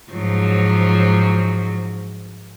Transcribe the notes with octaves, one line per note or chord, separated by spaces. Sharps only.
G#2 F3 F#3